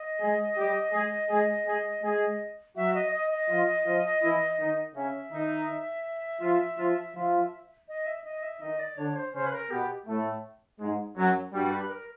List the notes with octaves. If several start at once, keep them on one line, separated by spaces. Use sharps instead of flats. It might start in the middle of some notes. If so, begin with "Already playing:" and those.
Already playing: D#5
G#3 G#4
G3 G4
G#3 G#4
G#3 G#4
G#3 G#4
G#3 G#4
F#3 F#4 E5
D#5
D#5
D#5
F3 F4
F3 F4
E3 E4
D#3 D#4
C#3 C#4 E5
D#3 D#4
F3 F4
F3 F4
F3 F4
D#5
E5
D#5
E5
D#3 D#4 D#5
D5
D3 D4 C#5
C5
C#3 C#4 C5
B4
A#4
B2 B3 G4
A2 A3
G#2 G#3
F#2 F#3
G2 G3 F#4
B4
A#4